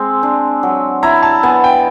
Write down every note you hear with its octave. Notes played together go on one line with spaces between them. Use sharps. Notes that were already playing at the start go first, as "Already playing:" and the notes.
Already playing: G#3 C4
D4
F#3
E4 A#5
A5
B3 G#5
G5